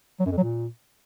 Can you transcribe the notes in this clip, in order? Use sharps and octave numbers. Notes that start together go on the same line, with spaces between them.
F#3
F#2
F2
F#3
A#2